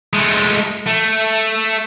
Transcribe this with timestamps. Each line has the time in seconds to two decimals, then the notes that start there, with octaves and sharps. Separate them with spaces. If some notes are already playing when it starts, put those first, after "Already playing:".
0.13 G#3 A3
0.87 A3